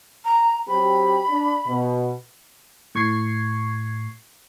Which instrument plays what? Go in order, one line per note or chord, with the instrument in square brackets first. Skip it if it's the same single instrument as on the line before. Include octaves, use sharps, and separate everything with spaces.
[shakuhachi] A#5
[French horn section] F#3 C4 G4 [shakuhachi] B5
[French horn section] D4
B2
[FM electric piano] A2 C#6 G#6 C7